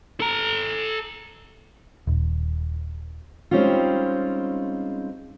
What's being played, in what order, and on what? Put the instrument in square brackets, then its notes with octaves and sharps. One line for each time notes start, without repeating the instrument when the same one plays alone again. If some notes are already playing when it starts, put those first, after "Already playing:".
[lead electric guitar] A4 A#5
[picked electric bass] D#1
[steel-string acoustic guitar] G3 G#3 C4 C#4 D#4 F4